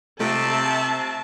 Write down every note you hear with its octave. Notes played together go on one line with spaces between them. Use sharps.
C3 A3 F4 D#5 E5 A5